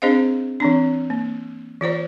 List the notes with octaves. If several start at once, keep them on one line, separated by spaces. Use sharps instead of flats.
C4 D4 G#4 C5 D#5 F5
E3 C4 D4
A#3
E3 F4 C5 D5